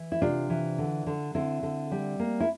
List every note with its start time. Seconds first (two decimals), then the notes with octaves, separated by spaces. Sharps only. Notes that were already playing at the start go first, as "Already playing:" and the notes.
Already playing: E3
0.12 E4
0.22 C3 D4 F4
0.50 E3
0.78 D3
1.06 D3
1.35 D3 C4 E4
1.63 D3
1.91 G3
2.19 A#3
2.40 E4